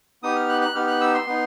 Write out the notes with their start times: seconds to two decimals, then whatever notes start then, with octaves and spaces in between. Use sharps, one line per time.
0.23 B3 D#4 G4 D#6
0.36 F6
0.49 F#6
0.62 F#6
0.75 B3 D#4 G4 F6
0.87 F#6
1.01 E6
1.14 C6
1.27 B3 D#4